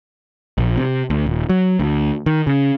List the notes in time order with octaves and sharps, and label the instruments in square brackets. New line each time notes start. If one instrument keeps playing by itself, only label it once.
[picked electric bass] A#1
C3
D2
D#1
F#3
D2
D#3
C#3